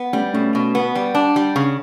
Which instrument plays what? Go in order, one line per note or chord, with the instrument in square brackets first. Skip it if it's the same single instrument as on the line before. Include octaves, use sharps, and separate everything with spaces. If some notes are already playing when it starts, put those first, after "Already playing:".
Already playing: [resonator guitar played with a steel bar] B3
[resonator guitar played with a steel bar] G3 [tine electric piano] A3 C#4
[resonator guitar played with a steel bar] B2 [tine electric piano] A3 C#4
[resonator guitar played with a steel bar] B2
B3
G3
D4
G3
C#3